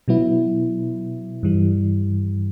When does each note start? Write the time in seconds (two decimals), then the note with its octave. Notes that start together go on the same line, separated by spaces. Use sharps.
0.08 B2 F#3 B3 E4
1.43 G2 E3 G3